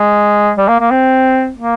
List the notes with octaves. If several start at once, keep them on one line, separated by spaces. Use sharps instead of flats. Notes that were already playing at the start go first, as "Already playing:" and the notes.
Already playing: G#3
G3
A#3
A#3
C4
A#3